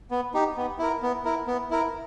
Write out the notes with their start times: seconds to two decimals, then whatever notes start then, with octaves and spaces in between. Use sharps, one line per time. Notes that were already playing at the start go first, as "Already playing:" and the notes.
0.11 B3
0.34 D#4 G4
0.57 B3
0.79 E4 A#4
1.02 B3
1.24 E4 A#4
1.47 B3
1.71 E4 A#4